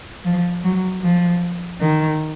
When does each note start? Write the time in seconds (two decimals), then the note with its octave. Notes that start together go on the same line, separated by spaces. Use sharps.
0.25 F3
0.64 F#3
1.03 F3
1.81 D#3